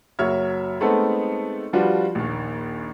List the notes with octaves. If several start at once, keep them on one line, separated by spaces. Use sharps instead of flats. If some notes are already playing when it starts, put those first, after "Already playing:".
F#1 F#3 C#5 E5 F6 G#6
G#3 A3 B3 C4 D#4 A4
F3 G3 D4 F4 F#4 B4
A#1 D#2